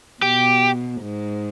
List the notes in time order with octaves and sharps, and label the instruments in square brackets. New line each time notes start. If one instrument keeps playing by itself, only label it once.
[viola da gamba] B2 [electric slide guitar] G4
[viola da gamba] G#2